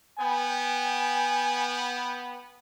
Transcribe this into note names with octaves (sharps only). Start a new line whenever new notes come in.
B3 G5 G#5